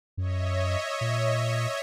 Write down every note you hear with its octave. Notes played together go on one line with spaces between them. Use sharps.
F#2 C#5 D#5 E5
A#2